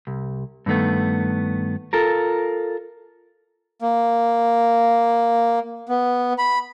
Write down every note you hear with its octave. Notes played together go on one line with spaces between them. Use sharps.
C2
G2 D#3 A3 B3
F4 A4 A#4
A#3
B3
B5